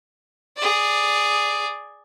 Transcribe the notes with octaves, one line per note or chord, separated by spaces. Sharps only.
G#4 D5